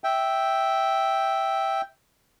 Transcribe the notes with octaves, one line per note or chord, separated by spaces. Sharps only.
E5 G5